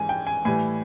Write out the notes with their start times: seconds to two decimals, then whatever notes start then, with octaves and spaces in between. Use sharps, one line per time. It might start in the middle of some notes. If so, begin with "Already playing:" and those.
Already playing: G#2 E3 G#5
0.09 G5
0.27 G#5
0.45 A2 E3 G3 G#5